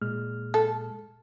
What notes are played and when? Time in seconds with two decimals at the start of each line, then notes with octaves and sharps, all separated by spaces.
0.02 A#2 G#3 F6
0.54 A4